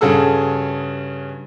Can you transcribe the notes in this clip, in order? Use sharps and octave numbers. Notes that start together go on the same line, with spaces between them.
G2 C#3 F#4 G#4 A4 E6